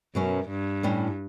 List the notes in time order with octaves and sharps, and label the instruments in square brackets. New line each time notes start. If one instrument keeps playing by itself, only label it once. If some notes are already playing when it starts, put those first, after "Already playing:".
[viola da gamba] F#2 [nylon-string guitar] B2 F#3 C#4
[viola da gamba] G2
[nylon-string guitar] A2 G3 C#4